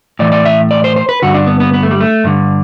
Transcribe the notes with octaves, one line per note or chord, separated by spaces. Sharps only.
A2 E3 D5
D5
E5
D5
C5
C5
B4
G2 D3 F#4
D4
B3
B3
B3
A3
G3
A3
G2 D3